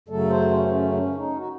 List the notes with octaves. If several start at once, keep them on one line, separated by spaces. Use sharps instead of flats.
F#2 C#3 F#3 A3 A4
C5
C#4
C#4
C#4
D#4
F#4